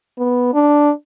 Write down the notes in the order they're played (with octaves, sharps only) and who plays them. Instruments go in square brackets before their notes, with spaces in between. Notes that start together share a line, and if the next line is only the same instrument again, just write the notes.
[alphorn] B3
D4